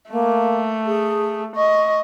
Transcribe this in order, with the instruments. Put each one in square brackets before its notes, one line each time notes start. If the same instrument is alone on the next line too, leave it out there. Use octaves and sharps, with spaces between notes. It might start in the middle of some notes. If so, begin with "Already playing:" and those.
[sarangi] A3 [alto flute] A#3
[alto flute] G#4
[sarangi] D#5 [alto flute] C#6